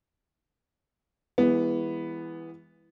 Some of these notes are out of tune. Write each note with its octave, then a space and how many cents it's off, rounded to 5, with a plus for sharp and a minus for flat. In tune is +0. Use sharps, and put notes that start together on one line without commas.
E3 +0 G#3 -40 B3 +0